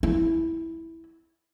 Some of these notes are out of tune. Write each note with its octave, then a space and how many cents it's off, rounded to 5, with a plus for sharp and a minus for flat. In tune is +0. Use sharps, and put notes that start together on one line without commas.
E4 -5